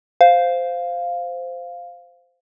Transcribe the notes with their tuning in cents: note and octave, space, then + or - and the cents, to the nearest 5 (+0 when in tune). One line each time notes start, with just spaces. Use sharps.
C5 -10 F5 +0